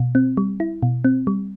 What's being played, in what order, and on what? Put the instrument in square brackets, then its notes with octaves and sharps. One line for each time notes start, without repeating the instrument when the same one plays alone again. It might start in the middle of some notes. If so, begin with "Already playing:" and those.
Already playing: [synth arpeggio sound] B2
C4
G3
E4
B2
C4
G3